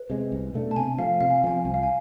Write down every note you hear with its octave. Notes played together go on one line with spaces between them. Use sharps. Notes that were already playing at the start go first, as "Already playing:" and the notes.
Already playing: B4
C3 G#3
C2
B2 A3 D4
A5
C3 G#5
F3 A3 F5
C3 F5
G#5
F5
F3 A3 C4 G#5
F5
C2 G#5
F5
G#5